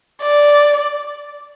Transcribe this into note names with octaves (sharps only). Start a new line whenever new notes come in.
D5